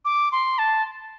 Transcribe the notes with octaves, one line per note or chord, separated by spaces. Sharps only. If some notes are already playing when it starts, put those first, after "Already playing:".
D6
C6
A5